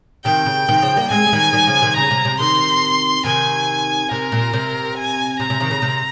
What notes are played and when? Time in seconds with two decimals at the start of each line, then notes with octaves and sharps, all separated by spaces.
0.25 C3 D#3 G5
0.46 C#3
0.69 C3 D#3
0.82 C#3 F3
0.96 G3 A#3
1.11 G#3 C4 G#5
1.27 G#3
1.33 D#3 G3
1.53 D#3 G3
1.67 C#3 F3
1.82 C3 D#3
1.96 C#3 A#5
2.11 C3
2.25 C3
2.39 C3 D#3 C6
3.24 C3 D#3 G#5
4.11 C3 A#4
4.32 A#2
4.53 C3
4.97 G#5
5.39 C3 A#5
5.50 C3
5.60 C3 D#3
5.71 C#3
5.82 C3